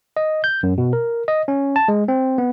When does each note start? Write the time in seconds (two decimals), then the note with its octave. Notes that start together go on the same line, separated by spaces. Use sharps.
0.17 D#5
0.44 G6
0.63 F#2
0.78 B2
0.93 A#4
1.28 D#5
1.48 C#4
1.76 A5
1.88 G#3
2.08 C4
2.38 B3